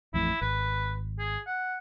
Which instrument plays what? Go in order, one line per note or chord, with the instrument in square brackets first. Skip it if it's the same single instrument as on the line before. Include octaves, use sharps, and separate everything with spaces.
[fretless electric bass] A1 F2 A2 [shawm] E4
[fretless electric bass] G#1 [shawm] B4
[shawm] G#4
F#5